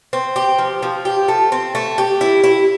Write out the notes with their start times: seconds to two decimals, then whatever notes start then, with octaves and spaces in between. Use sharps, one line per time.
0.13 C4
0.36 G4
0.58 F3
0.83 F3
1.05 G4
1.28 A3
1.52 C4
1.75 A3
1.98 G4
2.21 E4
2.44 E4